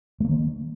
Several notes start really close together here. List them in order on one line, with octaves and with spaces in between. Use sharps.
A3 A#3 D#3